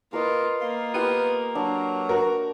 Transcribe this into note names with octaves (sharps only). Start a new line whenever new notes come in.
A#3 F4 A#4 B4 D#5
A#3 F4
B3 F4 G4 F5
F#3 D4
F#4 A#4